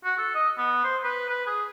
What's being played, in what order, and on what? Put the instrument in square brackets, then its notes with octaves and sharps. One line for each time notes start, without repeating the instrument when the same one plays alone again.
[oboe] F#4
A4
D#5
B3
C5
B4
B4
G#4